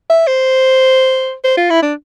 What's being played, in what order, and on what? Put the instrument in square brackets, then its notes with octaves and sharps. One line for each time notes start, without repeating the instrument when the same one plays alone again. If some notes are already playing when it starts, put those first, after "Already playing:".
[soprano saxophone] E5
C5
C5
F4
E4
D4